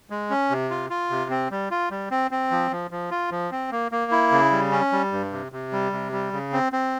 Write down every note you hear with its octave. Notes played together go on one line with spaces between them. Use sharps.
G#3
C#4
C3
F4
F4
C3
C4
G3
F4
G3
C4
C4
F3
F3
F3
F4
F3
C4
A#3
A#3
E4
C#3
G3
C#4
G3
G2
C3
C3
G3
C3
G3
C#3
C4
C4